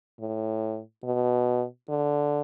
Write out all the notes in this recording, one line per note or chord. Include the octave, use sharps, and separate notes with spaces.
A2
B2
D3